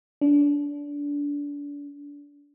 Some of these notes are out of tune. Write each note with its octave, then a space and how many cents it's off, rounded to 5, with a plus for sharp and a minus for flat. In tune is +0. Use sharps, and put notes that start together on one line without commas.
D4 -30